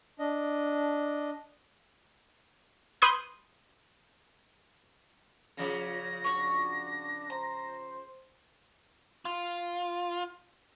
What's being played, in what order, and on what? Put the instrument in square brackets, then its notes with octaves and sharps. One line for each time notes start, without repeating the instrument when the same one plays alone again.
[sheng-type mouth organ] D4 D#5
[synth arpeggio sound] B4 C6 D#6 G6 G#6
[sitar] C#3 F3 D5 [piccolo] A#6
[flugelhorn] D4 [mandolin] F#4 C#5 C#6
[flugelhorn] C5 [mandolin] A#5
[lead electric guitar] F4